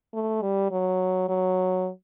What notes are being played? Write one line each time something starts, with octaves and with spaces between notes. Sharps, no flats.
A3
G3
F#3
F#3